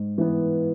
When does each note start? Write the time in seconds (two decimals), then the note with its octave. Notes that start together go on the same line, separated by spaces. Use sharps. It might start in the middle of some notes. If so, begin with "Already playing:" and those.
Already playing: G#2
0.18 E3 B3